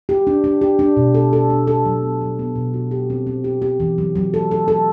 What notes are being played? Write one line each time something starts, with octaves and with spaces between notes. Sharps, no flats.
G4
D4
D4
G4
D4
B2
A4
A4
D4
A4
F#3
B3
F#3
B3
B2
F#4
G4
C4
C4
G4
G4
E3
F#3
F#3
A4
A4
A4